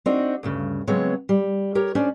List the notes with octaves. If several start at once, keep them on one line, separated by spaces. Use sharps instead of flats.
C4 D4 D#4 F#4
D2 G2 C#3
C#3 F#3 G#3 B3 C4 C#5
G3
G4 A#4 C#5
C#4 D4 C5 D5